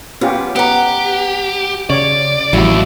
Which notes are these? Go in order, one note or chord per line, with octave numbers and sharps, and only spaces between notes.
B3 C#4 F4 G4
B3 G4 F#5 A#5
C#3 C#5 D5
A1 D#2 F#3 G3 E4